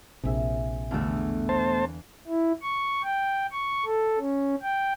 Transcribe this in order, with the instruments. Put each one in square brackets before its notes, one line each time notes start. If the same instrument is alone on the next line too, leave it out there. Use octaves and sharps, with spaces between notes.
[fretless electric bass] A#1 C3 [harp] G#4 E5
[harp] E2 D3 F5 [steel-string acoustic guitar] B2 A3
[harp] B4 [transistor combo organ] C5 A5
[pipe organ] E4
C#6
G5
C#6
A4
C#4
G5